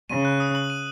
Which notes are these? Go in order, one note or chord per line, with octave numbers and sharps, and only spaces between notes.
C#3 D#7
F#6
D#6
F#7
D#7